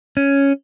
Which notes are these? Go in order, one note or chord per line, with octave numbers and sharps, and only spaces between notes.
C#4